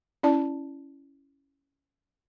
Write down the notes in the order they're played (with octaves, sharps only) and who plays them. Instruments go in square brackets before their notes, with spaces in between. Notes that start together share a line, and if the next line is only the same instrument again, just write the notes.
[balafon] C#4 E4 D5 A5